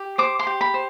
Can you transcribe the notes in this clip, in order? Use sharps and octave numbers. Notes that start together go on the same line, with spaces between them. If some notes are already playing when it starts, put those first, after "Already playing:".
Already playing: G4
C5 D6
C6
G4
B5
C5